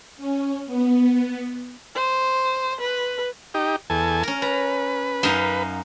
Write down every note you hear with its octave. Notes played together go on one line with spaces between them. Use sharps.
C#4
B3
C5
B4
D#4 G4
E2 A4 G#5
C#4 A#4
B4 A#5
F#2 D#4 F5